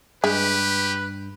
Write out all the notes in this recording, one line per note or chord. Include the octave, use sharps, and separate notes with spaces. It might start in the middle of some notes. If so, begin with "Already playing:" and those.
G2 G#3 G4 B4